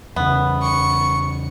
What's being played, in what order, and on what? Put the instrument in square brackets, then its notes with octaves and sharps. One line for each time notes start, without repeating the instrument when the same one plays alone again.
[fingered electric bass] E2 C#3 [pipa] B3
[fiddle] C#6